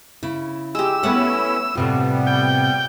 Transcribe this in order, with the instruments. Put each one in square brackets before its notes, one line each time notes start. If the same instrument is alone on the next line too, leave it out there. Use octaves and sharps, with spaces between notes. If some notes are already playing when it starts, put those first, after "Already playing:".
[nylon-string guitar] C#3 [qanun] E4
[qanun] G#3 G4 [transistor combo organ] E6
[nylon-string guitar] A3 B3 [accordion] C#4 E4 [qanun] B4 F#5 A5
[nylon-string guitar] A2 C3 F4 [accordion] G3 B3
[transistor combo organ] G5